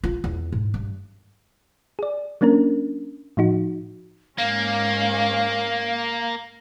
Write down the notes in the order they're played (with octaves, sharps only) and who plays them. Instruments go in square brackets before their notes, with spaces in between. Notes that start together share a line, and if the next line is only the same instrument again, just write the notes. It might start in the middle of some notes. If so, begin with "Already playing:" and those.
[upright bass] F4
E2
G#2
G2
[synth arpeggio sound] G#4 D5
F#3 A#3 C#4 D4 A#4
A2 F3 D#4 F#4
[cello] G#2 C#4 [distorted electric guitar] A#3 [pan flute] F5